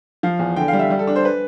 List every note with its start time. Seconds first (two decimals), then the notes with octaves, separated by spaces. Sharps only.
0.23 F3 F5
0.39 E2
0.56 D3 G5
0.68 F5
0.73 G3
0.79 E5
0.90 G3
0.99 A4
1.07 D4
1.16 C5
1.25 B4